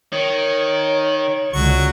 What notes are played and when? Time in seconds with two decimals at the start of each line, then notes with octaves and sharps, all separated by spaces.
0.13 D#3 C#5
1.53 C#2 D3 F#3 C#6